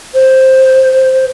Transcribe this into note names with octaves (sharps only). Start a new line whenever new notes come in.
C5